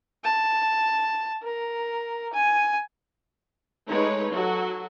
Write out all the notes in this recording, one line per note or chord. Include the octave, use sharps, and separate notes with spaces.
A5
A#4
G#5
G#3 A3 D#4 B4 C#5
F#3 F#4 A4